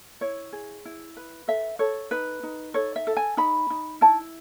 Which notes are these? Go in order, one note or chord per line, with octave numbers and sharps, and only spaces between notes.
E4 C#5
G#4
E4
B4
A4 E5
A4 C#5
D#4 B4
D#4
A4 C#5
E5
A4
G#5
D#4 B5
D#4
E4 A5